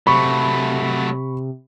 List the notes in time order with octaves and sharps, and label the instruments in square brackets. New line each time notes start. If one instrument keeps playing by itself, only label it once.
[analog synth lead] C3 [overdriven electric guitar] F#3 A3 [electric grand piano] B5 C#6